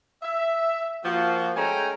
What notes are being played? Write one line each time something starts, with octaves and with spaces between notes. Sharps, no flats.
E5
F3 A#3 F#4
G#3 A3 C#4 G5 G#5 A#5